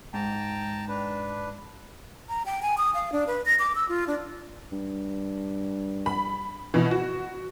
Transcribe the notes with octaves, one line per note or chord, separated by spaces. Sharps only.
G#2 G5 A5 A#5
D4 B4
A#5
G5
G#5
D#6
F5
D4
B4
A#6
D6
E6
F4
D4
G2
B5
B2 E3
F#4